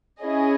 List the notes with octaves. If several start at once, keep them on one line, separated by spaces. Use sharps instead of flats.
C#4 E4 G#4 D#5